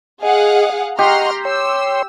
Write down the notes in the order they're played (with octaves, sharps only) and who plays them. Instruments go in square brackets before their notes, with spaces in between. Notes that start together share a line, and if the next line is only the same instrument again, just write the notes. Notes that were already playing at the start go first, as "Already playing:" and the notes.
[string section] G#4 F5 F#5 [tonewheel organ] D#5
[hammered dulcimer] G4 [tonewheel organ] D#5 F#5 C#6 [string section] A#5 C6 F6
[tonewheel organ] C#5 G5 C6 [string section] E6